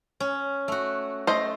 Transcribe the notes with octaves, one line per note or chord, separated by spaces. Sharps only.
C#4
A3 F#4
A3 C5 D#5